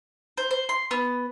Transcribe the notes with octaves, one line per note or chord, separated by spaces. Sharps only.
C5
C5
C6
B3